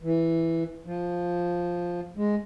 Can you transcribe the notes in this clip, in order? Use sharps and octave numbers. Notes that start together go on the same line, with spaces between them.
E3
F3
G#3